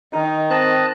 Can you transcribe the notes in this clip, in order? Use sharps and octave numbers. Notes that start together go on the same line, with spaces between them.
D#3 D#4
C4 D#5 A5 F#6